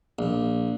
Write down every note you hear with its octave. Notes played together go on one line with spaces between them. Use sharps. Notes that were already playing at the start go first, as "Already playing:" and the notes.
A#1